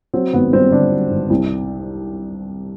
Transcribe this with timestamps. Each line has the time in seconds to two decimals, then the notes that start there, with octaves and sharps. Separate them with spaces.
0.14 F#3 C4
0.33 G#1 B3
0.53 G2 C4
0.72 D3 D4
0.91 F#3
1.11 G#1
1.30 C2